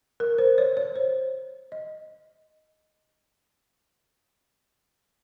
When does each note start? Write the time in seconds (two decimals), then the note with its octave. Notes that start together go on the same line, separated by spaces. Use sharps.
0.20 A#4
0.38 C5
0.58 C#5
0.77 C#5
0.96 C5
1.72 D#5